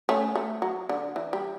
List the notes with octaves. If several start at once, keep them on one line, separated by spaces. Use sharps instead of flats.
A3 C#4
A3
F#3
D3
E3
G3